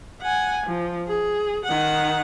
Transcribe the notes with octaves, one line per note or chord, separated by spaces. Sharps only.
F#5 G#5
F3
G#4
D#3 F#5